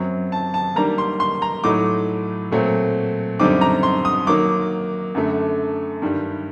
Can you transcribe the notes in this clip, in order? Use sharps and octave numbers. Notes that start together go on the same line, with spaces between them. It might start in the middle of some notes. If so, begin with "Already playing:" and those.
Already playing: F#2 F#3 C4
A5
A5
D#3 G3 A#3 D4 A#5
C6
C6
A#5
A2 F#3 A3 D#4 D6
A#2 F#3 A3 C4
F#2 D3 G3 C4 D#4 D6
A#5
C6
D#6
D#3 F#3 A#3 D6
F#2 D3 A3
G2 D#3 G3